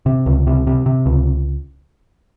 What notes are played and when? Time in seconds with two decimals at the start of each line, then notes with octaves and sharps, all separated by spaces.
0.06 C3
0.26 C#2
0.47 C3
0.67 C3
0.86 C3
1.06 C#2